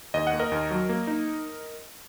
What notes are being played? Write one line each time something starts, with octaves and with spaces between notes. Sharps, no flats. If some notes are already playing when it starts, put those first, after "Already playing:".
D#2 D#5
F#5
A#3
A#4 D#5
D#2
F#3
A#3
D#4